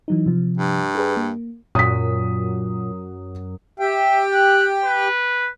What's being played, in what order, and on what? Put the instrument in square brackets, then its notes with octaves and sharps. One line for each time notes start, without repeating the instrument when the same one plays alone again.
[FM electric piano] E3 F#3 D#4
C3 F3
[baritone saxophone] G2
[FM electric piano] G4 G#4 B4
A#3
[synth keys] F#2 [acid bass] A#2 [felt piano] D#6 B6
[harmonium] G4 G5 [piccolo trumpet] E5
[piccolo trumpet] F#6
B4